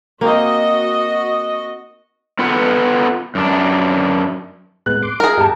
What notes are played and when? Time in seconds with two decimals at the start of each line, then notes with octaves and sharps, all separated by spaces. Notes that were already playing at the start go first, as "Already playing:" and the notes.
0.21 A#3 C4 D#4 F#4 D#5
2.39 B3 F4 A4 B4 F#5
3.35 F#2 D4
4.86 A2 G#3 B3 F#6
5.03 C6 D6
5.20 G#4 A#4 A#6
5.38 G2 G4 A5